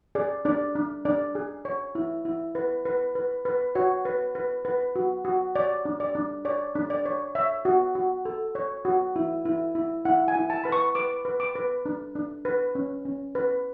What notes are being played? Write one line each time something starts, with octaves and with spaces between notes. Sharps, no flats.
G#4 D5
D4 D5
D4
D4 D5
G#4
C#5
E4
E4
B4
B4
B4
B4
F#4 C#5
B4
B4
B4
F#4
F#4
C#5 D5
D4
D5
D4
C#5 D5
D4
D5
C#5
C#5 E5
F#4
F#4
A4
C#5
F#4
E4
E4
E4
E4 F#5
G#5
E4
A5
B4 B5
C#6
B4 D6
B4
D6
B4
D4
D4
B4
C#4
C#4
B4